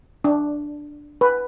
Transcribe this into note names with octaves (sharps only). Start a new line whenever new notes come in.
D4
B4